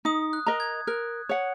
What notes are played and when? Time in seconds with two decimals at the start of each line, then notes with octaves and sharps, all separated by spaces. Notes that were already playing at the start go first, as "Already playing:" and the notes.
0.05 D#4 D#6
0.33 F#6
0.46 A#4 D#5 A#5
0.60 G#6
0.87 A#4 F#6
1.29 C#5 F#5